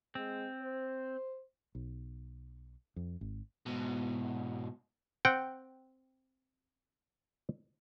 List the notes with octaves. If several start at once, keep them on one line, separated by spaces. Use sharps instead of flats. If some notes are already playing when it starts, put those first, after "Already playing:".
G#3 C4
C5
B1
F2
G#1
G#2 B2
C4 F#5 G5